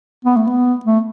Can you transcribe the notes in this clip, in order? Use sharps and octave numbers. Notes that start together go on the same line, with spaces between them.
B3
A3
B3
A3